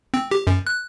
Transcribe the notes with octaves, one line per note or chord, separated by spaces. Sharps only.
C4
G4
F#2
F#6